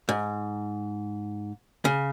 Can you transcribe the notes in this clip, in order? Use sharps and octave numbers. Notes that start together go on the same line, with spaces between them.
G#2
C#3